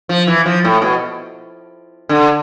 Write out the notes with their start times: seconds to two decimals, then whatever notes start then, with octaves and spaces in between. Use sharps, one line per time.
0.09 F3
0.27 E3
0.46 F3
0.64 A2
0.82 B2
2.09 D3